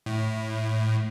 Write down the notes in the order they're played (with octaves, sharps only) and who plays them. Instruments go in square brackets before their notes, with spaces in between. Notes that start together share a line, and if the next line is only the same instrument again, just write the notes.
[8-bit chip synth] A2